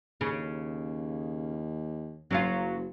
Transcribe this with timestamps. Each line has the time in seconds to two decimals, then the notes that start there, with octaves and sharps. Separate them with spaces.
0.21 D#2 C#3
2.31 F#1 F#3 C#4 F4